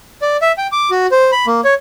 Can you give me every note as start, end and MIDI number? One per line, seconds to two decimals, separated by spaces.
0.22 0.37 74
0.42 0.52 76
0.58 0.67 79
0.72 0.90 86
0.91 1.07 66
1.11 1.31 72
1.32 1.46 83
1.47 1.61 58
1.64 1.74 73